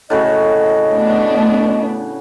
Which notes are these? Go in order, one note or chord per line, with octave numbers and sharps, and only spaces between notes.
A2 C#3 F#4 D#5
A3 B3 D4